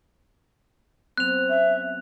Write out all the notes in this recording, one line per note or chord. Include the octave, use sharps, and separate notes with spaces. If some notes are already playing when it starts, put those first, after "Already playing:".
F#3 B3 C4 F#6 F7
C#4 E5